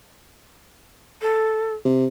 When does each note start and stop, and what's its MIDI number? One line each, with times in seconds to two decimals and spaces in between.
1.22 1.74 69
1.85 2.06 48